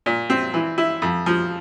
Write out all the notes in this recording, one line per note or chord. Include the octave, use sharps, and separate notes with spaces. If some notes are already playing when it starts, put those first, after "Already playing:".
A#2
C4
E3
E4
F2
F3